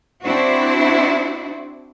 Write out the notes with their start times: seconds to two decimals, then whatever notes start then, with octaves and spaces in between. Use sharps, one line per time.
0.25 C4 D4 E4 F#4 C5